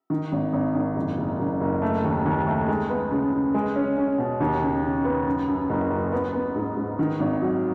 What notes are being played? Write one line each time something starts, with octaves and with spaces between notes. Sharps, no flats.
D#3
G#1
G#1
G#1
F#1
F#1
F#1
F#1
A3
D#2
D#2
A3
G#3
B3
C#3
C#3
G#3
C#4
C#4
B2
D#2
C#3
C#3
B3
F#2
F#2
F#1
F#2
B3
B3
G#2
G#2
D#3
G#1
F#3